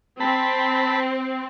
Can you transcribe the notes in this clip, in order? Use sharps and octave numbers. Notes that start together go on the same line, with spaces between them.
C4 A5 B5